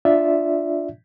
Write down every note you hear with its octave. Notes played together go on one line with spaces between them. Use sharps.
D4 F4 D5 E5